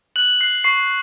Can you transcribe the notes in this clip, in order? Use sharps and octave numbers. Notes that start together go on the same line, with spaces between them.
F#6 F#7
F#6 C7
C#6 C7